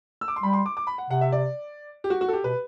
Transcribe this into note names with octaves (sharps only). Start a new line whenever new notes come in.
E6
D6
C6
G3 B5
C6
D6
D6
B5
F#5
C3 F#5
E5
D5
G4
F#4
F#4
A4
G4
B2 B4